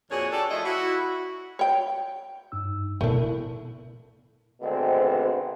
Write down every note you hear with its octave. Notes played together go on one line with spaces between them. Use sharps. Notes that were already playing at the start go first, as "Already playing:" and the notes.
F2 A#2 D4 F#4 G#4 C#5
D4 G4 A4 C#5 D5
F3 A3 E4 F4 D#5
E4 F#4
C#5 G5
G2 D#4 E6
B2 A3 D4 E4 A4 A#4
G#1 D2 B2 D3 C4